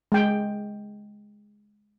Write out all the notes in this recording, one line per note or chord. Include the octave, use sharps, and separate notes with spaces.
G#3 G5